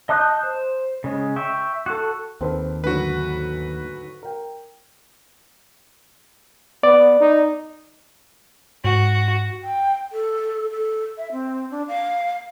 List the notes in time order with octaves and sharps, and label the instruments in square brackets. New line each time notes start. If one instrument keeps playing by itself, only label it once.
[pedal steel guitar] D#5 A5 D#6 F#6 G6
C5
C#3 G#3
E5 G5 C#6
F#4 A4
[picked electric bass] D#2 D#3 [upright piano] C4 A4 B4
[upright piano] D2 G#2 F#3 [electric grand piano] F#4 B4
[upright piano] A#4 G5
[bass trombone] B3 [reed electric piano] D5
[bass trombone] D#4
[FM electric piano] G#2 [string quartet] F#4
[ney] G5
A4
A4
E5
C4
D4
F5